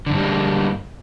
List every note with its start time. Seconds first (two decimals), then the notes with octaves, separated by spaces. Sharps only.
0.06 D3
0.11 G2
0.15 G3
0.19 G#3
0.23 A#3